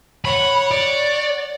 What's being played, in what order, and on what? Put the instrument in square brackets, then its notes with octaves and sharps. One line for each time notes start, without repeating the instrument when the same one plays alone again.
[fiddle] C#5 F#5 [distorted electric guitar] B5
[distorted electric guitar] D5